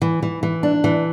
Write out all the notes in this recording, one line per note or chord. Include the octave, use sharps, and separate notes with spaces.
E3
E3
E3
D4
E3